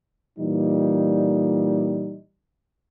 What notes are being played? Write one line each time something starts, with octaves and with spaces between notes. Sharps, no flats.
A#2 E3 G3 D#4